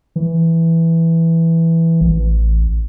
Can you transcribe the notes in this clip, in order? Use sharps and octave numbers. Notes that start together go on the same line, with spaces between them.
E3
A1